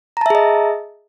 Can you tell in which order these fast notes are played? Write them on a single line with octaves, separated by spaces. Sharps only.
A#5 A5 E5 G#4 D#5